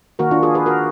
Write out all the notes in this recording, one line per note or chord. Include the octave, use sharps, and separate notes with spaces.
D#3 A#3 F#4 A#4
D4 F4
F4 G#4
G#4 B4
F#4 A#4